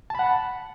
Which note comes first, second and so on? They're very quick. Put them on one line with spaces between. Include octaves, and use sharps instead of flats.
A5 B5 F#5